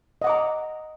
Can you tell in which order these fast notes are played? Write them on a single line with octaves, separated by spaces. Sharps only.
D#5 F#5 D6 A#5